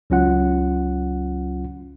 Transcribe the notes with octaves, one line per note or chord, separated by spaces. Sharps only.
C#2 F#3 C#4 F4 F#5